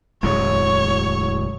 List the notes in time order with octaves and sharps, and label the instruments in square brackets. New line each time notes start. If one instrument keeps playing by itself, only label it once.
[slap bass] D1 E2 G#3 [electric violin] C#5